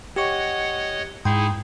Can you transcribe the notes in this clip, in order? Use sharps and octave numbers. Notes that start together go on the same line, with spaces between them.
G4 C#5 D#5 F#5 C#6
G#2 D#4 E4 G#4 G5 C6